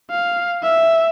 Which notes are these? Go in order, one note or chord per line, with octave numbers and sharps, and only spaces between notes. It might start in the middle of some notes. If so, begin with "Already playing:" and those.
F5
E5